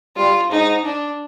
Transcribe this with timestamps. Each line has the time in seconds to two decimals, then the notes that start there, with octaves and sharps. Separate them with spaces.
0.17 G3 F4
0.51 G#2 D#4
0.85 D4